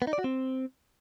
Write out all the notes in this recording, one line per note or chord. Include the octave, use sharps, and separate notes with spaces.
B3
D#4
D5
F#4
C4